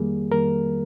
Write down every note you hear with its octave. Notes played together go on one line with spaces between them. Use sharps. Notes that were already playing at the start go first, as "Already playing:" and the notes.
Already playing: F2 D#3 G3 A#3 G#4
F2 D#3 G3 A#3 A#4